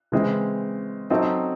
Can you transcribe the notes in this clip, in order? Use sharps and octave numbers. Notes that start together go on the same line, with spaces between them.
C#3 E3 G#3 C4
F#3 C4 D#4 A4